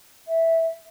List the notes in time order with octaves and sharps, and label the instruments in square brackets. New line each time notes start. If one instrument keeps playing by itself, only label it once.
[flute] E5